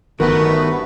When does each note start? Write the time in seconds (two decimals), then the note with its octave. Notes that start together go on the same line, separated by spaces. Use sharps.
0.20 G1 D#3 A3 B3 F#4 A#4 B4